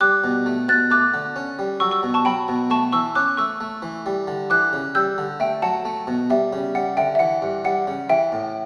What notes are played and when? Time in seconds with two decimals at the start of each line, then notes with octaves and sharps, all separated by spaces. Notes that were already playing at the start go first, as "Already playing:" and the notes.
0.01 G3 D6 F#6
0.24 B2
0.46 A3
0.69 B2 F#6 A6
0.90 A3 D6 F#6
1.14 D3
1.36 C#4
1.59 G3
1.80 F#3 C#6 E6
1.91 C#6 E6
2.03 B2
2.14 A5 C#6
2.25 F#3 G5 B5
2.48 B2
2.70 A3 A5 C#6
2.92 E3 C#6 E6
3.15 C#4 D6 F#6
3.37 A3 C#6 E6
3.60 A3
3.82 E3
4.06 G3
4.27 D3
4.50 E3 D6 F#6
4.73 C#3
4.95 G3 E6 G6
5.18 D3
5.40 A3 E5 G5
5.62 F#3 F#5 A5
5.85 A3
6.07 B2
6.30 G3 E5
6.53 C#3
6.75 G3 F#5
6.97 D3 E5 G5
7.15 E5
7.19 E3 F#5
7.42 G2
7.65 G3 F#5
7.87 C#3
8.09 E3 E5 G5
8.32 A2